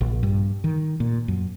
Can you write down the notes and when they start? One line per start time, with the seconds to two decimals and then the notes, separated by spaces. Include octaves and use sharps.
0.01 A#1
0.23 G2
0.64 D#3
1.00 A#2
1.28 F#2